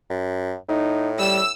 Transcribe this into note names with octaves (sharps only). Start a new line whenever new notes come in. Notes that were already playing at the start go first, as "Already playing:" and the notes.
F#2
A2 D#4
G3 E6